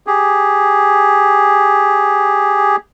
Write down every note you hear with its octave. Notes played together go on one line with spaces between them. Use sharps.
G4 G#4